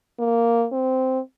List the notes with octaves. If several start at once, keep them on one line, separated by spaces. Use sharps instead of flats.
A#3
C4